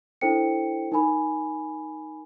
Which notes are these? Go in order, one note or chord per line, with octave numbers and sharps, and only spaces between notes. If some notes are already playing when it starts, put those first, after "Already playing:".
D4 E4 A4 C5 G5 C#7
D#4 A#4 G#5 B5